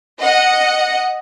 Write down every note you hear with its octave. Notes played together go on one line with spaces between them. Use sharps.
D#5 F#5 C#7